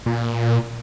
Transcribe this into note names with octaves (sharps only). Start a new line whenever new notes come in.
A#2